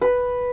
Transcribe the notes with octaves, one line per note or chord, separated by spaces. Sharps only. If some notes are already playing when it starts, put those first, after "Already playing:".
B4